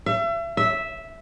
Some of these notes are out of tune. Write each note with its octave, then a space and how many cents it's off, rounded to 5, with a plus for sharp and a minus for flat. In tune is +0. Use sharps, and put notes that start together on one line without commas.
E5 +35
E5 -5